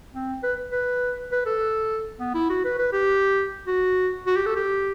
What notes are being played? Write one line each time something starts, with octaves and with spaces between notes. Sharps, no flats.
C4
B4
B4
B4
A4
B3
E4
F#4
B4
B4
G4
F#4
F#4
G4
A4
G4